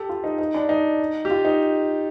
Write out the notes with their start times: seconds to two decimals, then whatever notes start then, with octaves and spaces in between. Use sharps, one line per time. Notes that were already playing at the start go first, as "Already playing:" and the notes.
Already playing: G4 A4
0.09 F4
0.24 D#4
0.38 D#4
0.54 D4
0.69 D#4
1.25 G4
1.30 F4
1.45 D#4